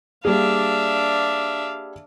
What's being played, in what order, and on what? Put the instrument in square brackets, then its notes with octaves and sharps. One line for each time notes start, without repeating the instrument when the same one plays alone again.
[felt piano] G3 A#3 G#4 [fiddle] D4 E5 [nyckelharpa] D5 F5